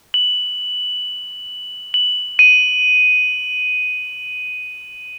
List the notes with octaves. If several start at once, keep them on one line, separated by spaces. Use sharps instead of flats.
F#7
F#7
D#7